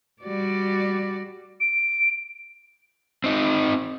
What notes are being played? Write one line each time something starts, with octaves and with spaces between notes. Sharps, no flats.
G3 F#4 D5
D7
C4 D#4